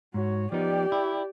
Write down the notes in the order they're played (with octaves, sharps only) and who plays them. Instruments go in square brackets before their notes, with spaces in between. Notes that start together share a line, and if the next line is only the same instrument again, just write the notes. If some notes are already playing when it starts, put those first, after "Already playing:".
[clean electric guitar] G#2 [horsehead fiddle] F#4 C#5
[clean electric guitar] F3 B3 D#4 [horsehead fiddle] G4 D5
[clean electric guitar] E4